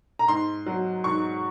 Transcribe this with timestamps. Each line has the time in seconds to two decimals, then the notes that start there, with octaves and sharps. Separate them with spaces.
0.19 A#5
0.28 G#2 C6
0.66 F#3
1.04 G#2 C#6